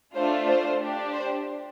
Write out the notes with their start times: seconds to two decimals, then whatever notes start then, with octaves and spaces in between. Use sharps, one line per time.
0.15 A3 D4 F4 C5
0.48 C5
0.80 D4 G4
1.12 C5